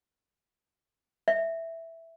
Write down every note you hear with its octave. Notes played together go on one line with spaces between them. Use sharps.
E5